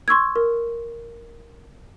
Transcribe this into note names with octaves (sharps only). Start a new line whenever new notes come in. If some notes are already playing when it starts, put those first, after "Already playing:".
C6 C#6 E6 G#6
A#4